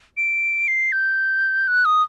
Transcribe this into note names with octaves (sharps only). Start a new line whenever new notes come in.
D7
C7
G6
F#6
D#6